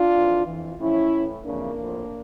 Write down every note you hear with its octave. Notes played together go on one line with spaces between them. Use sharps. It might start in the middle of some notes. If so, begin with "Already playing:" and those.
Already playing: D4 F4
F2 E3
F2 E3
A2 F3 C#4 E4
A2 E3
F2 C#3 E3 A#3 D4
A2 F3